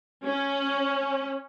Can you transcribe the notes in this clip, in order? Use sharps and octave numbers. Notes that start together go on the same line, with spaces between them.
C#4